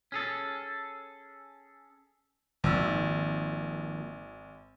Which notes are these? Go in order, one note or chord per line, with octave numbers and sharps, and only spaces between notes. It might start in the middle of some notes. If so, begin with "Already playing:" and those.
C#4 G#4 A4
G#1 D#3 F3 A#3 E6